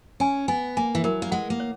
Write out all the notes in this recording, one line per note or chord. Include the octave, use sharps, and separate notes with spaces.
C#4 G#5
B3 G#5
A#3 G#5
E3
F#3 A#4
A#3
G#3 F#5
A#3
C#5